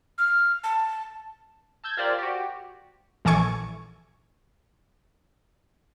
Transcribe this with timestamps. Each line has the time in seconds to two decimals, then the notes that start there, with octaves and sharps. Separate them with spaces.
0.18 F6
0.64 A5
1.84 A5 E6 G6 G#6
1.97 F4 G4 A#4 C5 D5
2.19 F#4 G4
3.25 A#1 E3 A4 G#5 C#6 G#6